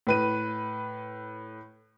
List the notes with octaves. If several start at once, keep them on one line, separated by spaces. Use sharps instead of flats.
A2 B4 D#7